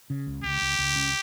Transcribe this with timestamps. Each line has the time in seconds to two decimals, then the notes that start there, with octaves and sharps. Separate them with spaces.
0.10 C#3
0.27 C#2
0.44 C#2 G4
0.61 C#2
0.79 C#2
0.96 C#3